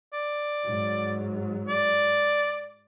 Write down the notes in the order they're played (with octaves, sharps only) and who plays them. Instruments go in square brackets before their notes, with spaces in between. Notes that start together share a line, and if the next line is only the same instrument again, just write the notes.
[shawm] D5
[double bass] G#2 F#3
[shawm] D5